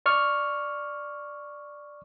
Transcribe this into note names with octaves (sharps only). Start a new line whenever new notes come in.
D5 C#6 F6